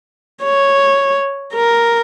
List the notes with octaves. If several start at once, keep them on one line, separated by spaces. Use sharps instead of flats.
C#5
A#4